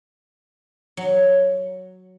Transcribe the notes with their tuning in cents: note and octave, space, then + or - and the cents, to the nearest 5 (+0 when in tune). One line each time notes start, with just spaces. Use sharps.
F#3 +0 F#5 +0